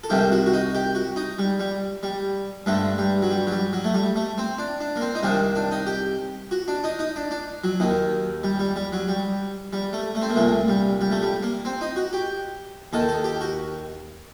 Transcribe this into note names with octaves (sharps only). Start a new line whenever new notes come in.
A4
C2 C3 D#3 G4
F#4
F#4
D#4
G4
F#4
D#4
G3
G3
G3
G2 D3 A3
G3
F#3
G3
F#3
G3
F#3
A3
G3
A3
C4
D4
D4
A#3
C4
D#4
C2 C3 D#3 D4
D4
D#4
G4
F#4
D4
D#4
D#4
D4
D4
F#3
D#2 D#3
G3
G3
G3
F#3
G3
G3
A3
A3
C4
A#3
C2 A#2 A3
G3
G3
A3
G3
A#3
C4
D#4
F#4
G4
D#2 D#3 A4
A4
G4
F#4